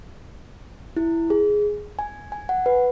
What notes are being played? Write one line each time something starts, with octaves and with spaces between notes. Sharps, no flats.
E4
G#4
G#5
G#5
F#5
B4